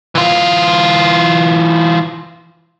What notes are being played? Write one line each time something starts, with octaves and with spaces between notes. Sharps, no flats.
E3 F4